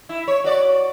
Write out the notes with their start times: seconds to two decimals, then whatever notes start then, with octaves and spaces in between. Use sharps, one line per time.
0.09 E4
0.28 C#5
0.44 F#4 D5